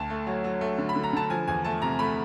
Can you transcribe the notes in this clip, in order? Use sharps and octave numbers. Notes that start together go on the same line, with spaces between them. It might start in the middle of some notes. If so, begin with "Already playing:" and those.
Already playing: D2 A5
A3
F#3
F#3
A3
D3
B5
D3
A#5
D3 A5
F3 G#5
E2 G#5
A3 A5
C3 A#5
A3 B5